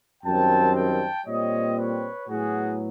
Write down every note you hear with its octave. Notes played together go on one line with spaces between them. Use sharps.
F#2 D#3 G3 C4 G5 A5
G5 A5
A#2 G3 C4 C#5 D#5
B4 C#5
A2 F#3 B3 F#4 G#4